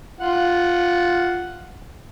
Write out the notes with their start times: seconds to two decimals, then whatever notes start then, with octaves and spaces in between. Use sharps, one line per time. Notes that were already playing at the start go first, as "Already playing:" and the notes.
0.21 F4 F#5